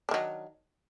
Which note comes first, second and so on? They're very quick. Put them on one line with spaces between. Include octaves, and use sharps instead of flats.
D4 D#3 F#3